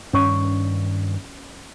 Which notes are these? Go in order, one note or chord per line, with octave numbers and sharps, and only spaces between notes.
G2 D#3 C#4 C#5 C#6